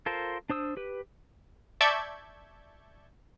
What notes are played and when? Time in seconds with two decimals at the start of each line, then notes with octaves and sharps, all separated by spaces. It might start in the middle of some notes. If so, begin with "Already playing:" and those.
0.06 F4 A4 A#4 C5
0.50 D4 C5 D#6 E6
0.77 G4 B4
1.81 D5 E5 A5 C#6 G6 G#6